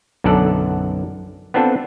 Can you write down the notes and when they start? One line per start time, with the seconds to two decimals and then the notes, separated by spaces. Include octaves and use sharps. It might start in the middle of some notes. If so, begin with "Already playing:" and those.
0.24 B1 F#2 D3 A4 D5 F#5
1.54 B3 C4 D4 F4 A4 C5